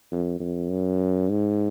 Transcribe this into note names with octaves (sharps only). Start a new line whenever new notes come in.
F2
F2
F#2
G#2